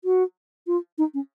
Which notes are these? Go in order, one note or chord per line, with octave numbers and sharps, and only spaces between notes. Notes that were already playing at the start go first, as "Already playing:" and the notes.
F#4
F4
D#4
C#4